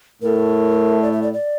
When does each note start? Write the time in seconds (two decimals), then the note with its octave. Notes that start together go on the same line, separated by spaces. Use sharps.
0.22 A2 A3 A#4
1.02 D5
1.12 E5
1.22 D5
1.34 D5